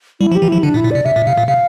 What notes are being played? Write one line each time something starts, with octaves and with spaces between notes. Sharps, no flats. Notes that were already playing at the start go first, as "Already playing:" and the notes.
G3 E4
F3
G4
E3
F3 E4
D3 D4
A#2
E4
A#2
C3 D5
C3 E5
A#2
C3 F5
A#2
C3 F5